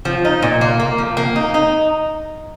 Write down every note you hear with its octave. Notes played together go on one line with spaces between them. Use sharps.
F3
D#4
A#2
A#3
A#3
F3
A#3
D#4
D#4